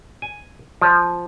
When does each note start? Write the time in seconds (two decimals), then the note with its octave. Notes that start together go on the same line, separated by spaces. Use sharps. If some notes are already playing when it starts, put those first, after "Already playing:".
0.22 G#5
0.82 F3